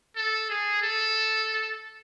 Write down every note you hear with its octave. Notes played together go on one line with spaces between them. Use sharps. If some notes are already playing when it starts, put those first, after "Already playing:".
A4
G#4
A4